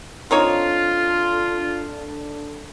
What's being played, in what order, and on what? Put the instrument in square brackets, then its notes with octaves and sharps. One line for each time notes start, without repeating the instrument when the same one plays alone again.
[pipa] C4 D#4 C#5 [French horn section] D4 A4 [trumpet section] F4